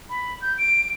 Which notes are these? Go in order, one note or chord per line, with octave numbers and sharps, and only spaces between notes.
B5
G6
D7